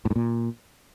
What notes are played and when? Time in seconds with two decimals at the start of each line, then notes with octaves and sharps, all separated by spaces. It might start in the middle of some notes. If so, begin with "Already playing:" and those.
0.05 A2
0.10 G#2
0.16 A#2